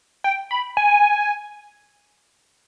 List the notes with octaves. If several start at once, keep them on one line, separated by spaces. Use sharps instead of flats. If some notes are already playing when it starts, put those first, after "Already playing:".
G5
B5
G#5